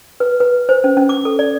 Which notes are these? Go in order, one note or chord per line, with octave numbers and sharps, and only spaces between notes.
B4
B4
C5
C#4
C#4
D6
A4
D5